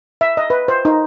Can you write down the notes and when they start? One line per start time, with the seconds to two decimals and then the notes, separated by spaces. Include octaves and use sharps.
0.21 E5
0.37 D#5
0.50 B4
0.68 C5
0.85 D#4